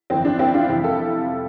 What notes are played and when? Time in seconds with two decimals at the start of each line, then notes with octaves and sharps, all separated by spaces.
0.10 G1 F2 E3 C4
0.25 D4
0.39 C4 E4
0.54 D4 F4
0.69 F2 C3 E3 E4 G4
0.83 F4 A4